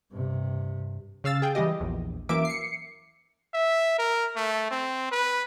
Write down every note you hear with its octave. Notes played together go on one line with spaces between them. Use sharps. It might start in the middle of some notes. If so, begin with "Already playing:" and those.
G2 C3
C#3 F5 E6 A6
G#4 G5
E3 G3 G#3 G4 D#5
A#1 E2
F#2 E3 A#3 E5 D6 D7
C7 C#7
E5
A#4
A3
C4
B4